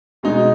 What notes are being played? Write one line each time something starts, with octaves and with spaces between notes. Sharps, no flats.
B2 G#3 D#4